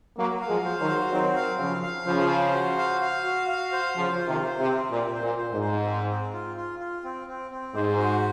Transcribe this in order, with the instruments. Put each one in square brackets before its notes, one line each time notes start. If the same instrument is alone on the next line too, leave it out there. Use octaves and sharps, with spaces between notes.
[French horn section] F#3 A#3 [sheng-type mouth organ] F#4
[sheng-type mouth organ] F5
[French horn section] F3 G#3
[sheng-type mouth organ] C5
[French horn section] D#3 F#3
[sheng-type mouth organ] F#4
[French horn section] D#3 F#3 [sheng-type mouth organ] C4
[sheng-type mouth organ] F5
[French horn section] C#3 F3 [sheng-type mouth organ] F5
[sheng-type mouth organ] F5
[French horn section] C#3 F3 [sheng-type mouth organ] C5
[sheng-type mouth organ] C5
F#4
F5
F5
F#4
F5
C5
[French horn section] C#3 F3 [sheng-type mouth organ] F4
[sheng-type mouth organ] F4
[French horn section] C3 D#3
[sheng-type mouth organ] C5
[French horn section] C3
[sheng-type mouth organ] C4
[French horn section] A#2 [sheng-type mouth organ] C4
[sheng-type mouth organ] C5
[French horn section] A#2
[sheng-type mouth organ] C5
[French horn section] G#2
[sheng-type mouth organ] C5
C4
C4
F4
F4
F4
C4
C4
C4
[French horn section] G#2 [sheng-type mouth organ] C5
[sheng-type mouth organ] F#4